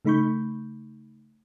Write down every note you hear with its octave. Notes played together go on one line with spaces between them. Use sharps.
C#3 A3 D#4 B5 C#6 G6